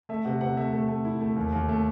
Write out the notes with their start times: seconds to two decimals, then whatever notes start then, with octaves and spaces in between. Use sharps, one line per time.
0.09 A3 E5
0.25 C3 F#5
0.41 C3 F#5
0.57 A3 E5
0.73 A3
0.88 A3
1.05 E4
1.21 A3
1.36 D#2
1.52 D#2
1.69 A3